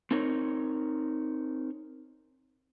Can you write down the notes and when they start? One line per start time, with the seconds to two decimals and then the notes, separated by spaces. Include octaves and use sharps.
0.11 C4 D#4 A#4 C#5